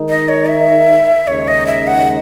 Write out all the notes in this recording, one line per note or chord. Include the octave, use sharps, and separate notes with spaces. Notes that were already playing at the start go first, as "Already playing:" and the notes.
Already playing: D#3 G#3 D#4
D#5
C#5
E5
D#2 C#3 G#3 D#4 C#5
D#5
E5
F#5